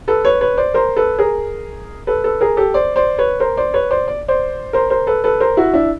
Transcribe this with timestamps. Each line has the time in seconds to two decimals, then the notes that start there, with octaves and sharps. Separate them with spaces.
0.08 A4 B4
0.25 B4 C#5
0.41 B4 C#5
0.57 C5 D5
0.74 A#4 C5
0.96 A4 B4
1.19 G#4 A#4
2.07 A4 B4
2.24 A4 B4
2.41 G#4 A#4
2.57 G4 A4
2.74 C5 D5
2.96 C5 D5
3.18 B4 C#5
3.40 A#4 C5
3.57 C5 D5
3.74 B4 C#5
3.90 C5 D5
4.08 D5
4.28 C5 D5
4.73 A#4 C5
4.90 A#4 C5
5.07 A4 B4
5.24 A4 B4
5.40 A#4 C5
5.57 E4 F#4
5.74 D4 E4